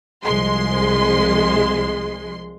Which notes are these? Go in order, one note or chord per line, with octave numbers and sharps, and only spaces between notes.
C2 F3 G#3 C6